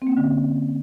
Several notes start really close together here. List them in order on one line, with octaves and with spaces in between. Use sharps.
C4 A#3 C#4 D3